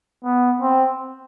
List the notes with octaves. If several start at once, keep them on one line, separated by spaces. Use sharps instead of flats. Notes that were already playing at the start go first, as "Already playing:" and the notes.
B3
C4